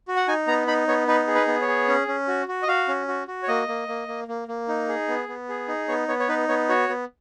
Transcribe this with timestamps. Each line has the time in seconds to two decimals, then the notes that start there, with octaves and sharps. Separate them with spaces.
0.08 F#4
0.16 F#5
0.28 D#4 G#5
0.47 B3 A#5
0.67 D#4 B5
0.88 B3 C#5
1.07 D#4 B4
1.27 G#4
1.35 B4
1.47 B3
1.62 C#5
1.68 G#4
1.88 C#4
2.07 C#4
2.28 F#4
2.48 F#4
2.63 D#5
2.68 F#4 F5
2.88 C#4
3.08 F#4
3.28 F#4
3.43 C#5
3.48 A#3 D#5
3.68 A#3
3.88 A#3
4.08 A#3
4.28 A#3
4.48 A#3
4.68 D#4
4.88 G#4
5.08 B3
5.28 B3
5.49 G#4
5.68 D#4
5.88 B3 C#5
6.08 B3 C#5
6.20 C#5
6.29 D#4 B4
6.48 B3 C#5
6.69 F#4 C#5
6.89 B3